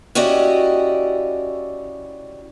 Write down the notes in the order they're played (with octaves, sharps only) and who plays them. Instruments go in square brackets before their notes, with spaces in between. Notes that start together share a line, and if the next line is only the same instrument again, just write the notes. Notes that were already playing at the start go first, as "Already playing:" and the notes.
[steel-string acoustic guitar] C#4 E4 F#4 G4 D5 D#5